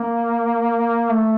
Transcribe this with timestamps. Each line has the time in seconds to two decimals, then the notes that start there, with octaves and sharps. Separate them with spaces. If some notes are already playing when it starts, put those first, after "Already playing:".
Already playing: A#3
1.10 A3